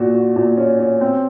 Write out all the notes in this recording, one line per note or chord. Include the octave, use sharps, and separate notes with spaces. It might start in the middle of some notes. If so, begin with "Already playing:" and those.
Already playing: A#2 F#4
F#4
A#2
C#4
C#4
C4